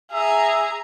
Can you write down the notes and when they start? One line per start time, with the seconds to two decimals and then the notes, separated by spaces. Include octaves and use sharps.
0.12 G#4 E5 A#5